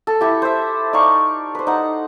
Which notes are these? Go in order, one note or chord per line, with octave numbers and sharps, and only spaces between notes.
A4
E4 G4
C5 E5
D#4 D5 F5 C#6
B4 C5
D#4 F#5